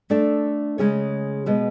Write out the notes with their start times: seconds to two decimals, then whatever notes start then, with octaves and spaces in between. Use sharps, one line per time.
0.10 A3 D4 A4 D5
0.78 C#3 G#3 C#4 G#4 C#5
1.46 B2 G#3 B3